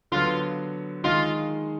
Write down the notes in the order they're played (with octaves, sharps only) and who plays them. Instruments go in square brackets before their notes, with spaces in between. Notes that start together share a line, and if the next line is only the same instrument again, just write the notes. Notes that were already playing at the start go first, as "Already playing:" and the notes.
[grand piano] D3 F#3 B3 [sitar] F4
[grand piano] D#3 G#3 D#4 [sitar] F4